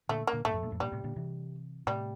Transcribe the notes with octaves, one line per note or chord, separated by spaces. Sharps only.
A#2 D3 A3
A#3
A#2 D3
G2 A#2 A3
F2 A2
G2 A#2
F2 A2
G2 A#2 G3
A2 C3
A#2 D3
C3 E3
A2 C3 G3